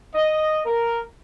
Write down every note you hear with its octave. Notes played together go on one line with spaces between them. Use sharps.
D#5
A#4